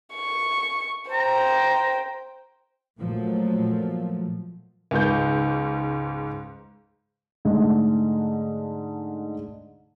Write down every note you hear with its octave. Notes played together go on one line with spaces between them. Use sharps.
C#6
C5 G5 A#5
A#2 F3 F#3 A3
C#2 G#2 G6
G#2 D3 G#3 A3